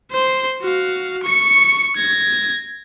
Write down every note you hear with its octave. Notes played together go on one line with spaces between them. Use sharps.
C5 C6
F#4 F5
C#6 C#7
G#6 A#6